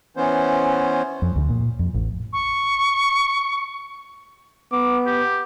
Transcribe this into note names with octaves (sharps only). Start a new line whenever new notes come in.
E3 B3 C#4 C5
F2
D2
A#2
F2
A1
C#6
B3 D6
G4